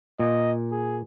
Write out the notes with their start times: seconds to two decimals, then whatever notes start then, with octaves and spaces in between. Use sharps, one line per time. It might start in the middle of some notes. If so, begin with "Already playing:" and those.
0.19 A#2 D#5
0.72 G#4